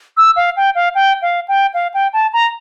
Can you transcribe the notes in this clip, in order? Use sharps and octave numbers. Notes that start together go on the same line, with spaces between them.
E6
F5
G5
F5
G5
F5
G5
F5
G5
A5
A#5